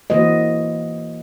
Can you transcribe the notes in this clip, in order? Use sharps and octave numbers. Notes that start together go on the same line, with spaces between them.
E3 A#3 F#4 C5 D#5